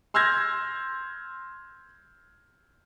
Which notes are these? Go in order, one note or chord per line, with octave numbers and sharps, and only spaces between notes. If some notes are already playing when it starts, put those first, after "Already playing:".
C6 E6 F6 G6 G#6 A#6